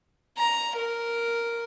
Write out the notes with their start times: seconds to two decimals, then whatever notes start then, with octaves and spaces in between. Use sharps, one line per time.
0.38 A#5
0.76 A#4